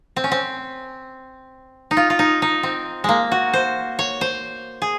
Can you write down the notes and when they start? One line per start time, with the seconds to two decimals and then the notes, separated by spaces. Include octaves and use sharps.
0.16 C4
0.24 C#4
0.31 C4
1.91 D#4
1.97 F4
2.10 F4
2.19 D#4
2.42 D#4
2.63 C4
3.04 G#3 A#3
3.32 F#4
3.53 C5
3.99 C#5
4.21 C5
4.82 G#4